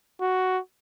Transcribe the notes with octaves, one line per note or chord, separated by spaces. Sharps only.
F#4